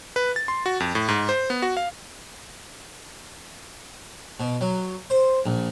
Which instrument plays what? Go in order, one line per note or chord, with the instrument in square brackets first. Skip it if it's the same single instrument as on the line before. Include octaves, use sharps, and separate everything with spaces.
[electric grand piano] B4
A6
C6
F#4
F2
A2
G#2
C5
B3
F#4
F5
[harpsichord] B2
F#3
C5
A#1